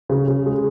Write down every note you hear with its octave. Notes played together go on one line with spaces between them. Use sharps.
C#3
C#3
G#3